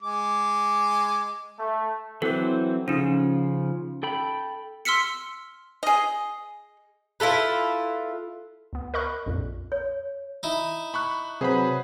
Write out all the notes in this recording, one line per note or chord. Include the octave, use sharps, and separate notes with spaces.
G#3 D6
A3
E3 F#3 C4 E4 A4
C#3 F3 C#4 D#4
A4 G5 B5
C6 E6 F6 B6 C#7
G#4 D#5
E4 F4 A4 B4
D2 B3
A#4 D#5 B5 C#6 F#6
A#1 F2 A#2
C#5
D#4 E4
B5 C#6 F#6
C3 F#3 G#4 B4 C5 B5